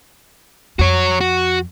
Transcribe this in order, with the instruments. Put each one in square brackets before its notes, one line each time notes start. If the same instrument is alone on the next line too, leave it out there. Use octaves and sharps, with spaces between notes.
[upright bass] F2 [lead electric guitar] F#4 C#5
[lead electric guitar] F#4